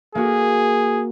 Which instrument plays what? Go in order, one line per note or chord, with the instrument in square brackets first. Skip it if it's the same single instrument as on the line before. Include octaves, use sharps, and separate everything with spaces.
[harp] A#3 F#4 [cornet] G#4